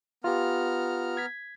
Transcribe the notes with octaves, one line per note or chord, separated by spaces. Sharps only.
B3 F4 G4 A#5 F6
G#6 B6